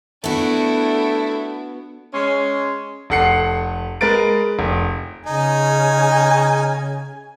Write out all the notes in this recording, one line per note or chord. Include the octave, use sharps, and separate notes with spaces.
A3 B3 D4 E4 F#4
G#3 C#4 C#5 C6
F1 A4 F#5 C7 C#7
G#3 A#4 B4 A6 D7
F1
C#3 D#4 G#5